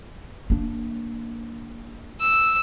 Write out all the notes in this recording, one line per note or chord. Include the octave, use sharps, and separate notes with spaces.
A#3 D4
E6